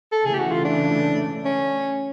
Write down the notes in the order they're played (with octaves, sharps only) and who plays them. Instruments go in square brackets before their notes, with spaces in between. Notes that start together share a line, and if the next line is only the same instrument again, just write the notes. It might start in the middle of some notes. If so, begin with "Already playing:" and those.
[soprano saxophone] A4
[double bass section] C#3 E3 A3 [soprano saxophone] G#4
[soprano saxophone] G4
F#4
F4
D4
C#4